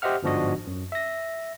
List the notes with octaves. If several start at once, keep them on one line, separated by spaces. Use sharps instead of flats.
G4 C5 D#5 E5 F#5 F6
G1 G#2 F3 D4 F#4 D#5
F#2
E5 A#6